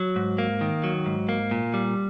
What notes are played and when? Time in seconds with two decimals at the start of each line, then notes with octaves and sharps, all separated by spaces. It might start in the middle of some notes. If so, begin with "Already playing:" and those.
Already playing: F#3
0.16 G#2
0.38 A#3
0.61 D#3
0.84 F#3
1.06 G#2
1.29 A#3
1.51 A#2
1.74 G3